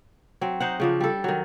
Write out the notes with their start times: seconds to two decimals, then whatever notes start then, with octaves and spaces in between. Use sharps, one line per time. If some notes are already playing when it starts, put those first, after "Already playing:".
0.41 F#3 C4
0.60 D#4 C5 F#5
0.80 C#3 F3 D4
1.00 G3 A4
1.24 D#3 F#3